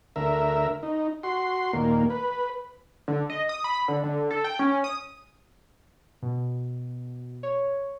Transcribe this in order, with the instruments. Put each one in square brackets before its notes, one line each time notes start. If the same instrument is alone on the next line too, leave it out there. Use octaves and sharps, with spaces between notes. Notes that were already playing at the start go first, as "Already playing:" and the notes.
[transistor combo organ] D2 A#4 E5
D#4
F#4 C6
D#2 A#2 A#3
B4
[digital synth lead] D3
D#5
D#6
B5
D3
D3
A4
G5
C#4
D#6
[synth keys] B2
C#5